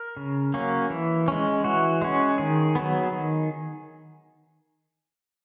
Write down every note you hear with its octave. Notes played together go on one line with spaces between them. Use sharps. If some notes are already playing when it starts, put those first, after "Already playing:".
Already playing: A#4
C#3
F#3 A#3 C#4
E3
G#3 C#4
E3 F#4
G#3 C#4
D#3 G#4
F#3 B3
D#3